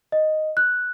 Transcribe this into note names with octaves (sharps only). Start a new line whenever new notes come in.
D#5
F#6